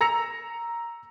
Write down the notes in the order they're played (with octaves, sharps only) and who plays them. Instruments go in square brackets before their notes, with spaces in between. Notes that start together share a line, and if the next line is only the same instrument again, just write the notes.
[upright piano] A#5 E6 A#6 C#7 F7